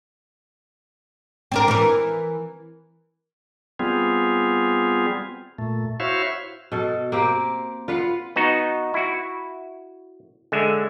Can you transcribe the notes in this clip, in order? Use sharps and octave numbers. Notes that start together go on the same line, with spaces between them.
C4 D4 A#4
E3 A#4
G3 B3 C4 F4 G#4
A#2 A3
E4 F#4 C5 C#5 E5 F5
B2 A4
A#3 C4 G4
F4 B4 F5 F#5
B3 D#4 F#4
E4 F#4
D3 G#3 E5